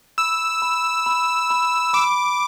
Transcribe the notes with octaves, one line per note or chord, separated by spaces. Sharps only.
B5 E6
B5
B5
B5
B5 D6